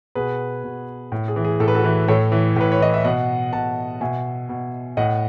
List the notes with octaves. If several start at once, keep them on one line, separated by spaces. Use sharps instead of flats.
B2 G#4 B4
B2
A2
G#4
E3
G#4
A2 A4
B4
F#4 A4
E3
A2 A4 C#5
E3
A2 B4
C#5
E3 D#5
E5
B2 D#5 F#5
B2 F#5 A5
B2 E5 G#5
B2
A2 D#5 F#5